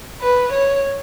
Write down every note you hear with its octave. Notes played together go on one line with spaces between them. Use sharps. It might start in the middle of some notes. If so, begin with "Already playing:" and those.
B4
C#5